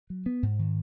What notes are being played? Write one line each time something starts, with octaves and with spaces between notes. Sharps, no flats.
F#3
B3
G#2
D#3